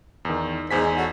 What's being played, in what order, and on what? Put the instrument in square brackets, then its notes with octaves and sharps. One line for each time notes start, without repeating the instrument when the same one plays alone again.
[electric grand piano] E2 D#3
[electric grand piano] E2 G#5 B6 [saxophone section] G#2
[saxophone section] F#4 A4 C#5